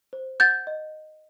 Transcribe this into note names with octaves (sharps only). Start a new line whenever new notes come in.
C5
F#5 G6 A6
D#5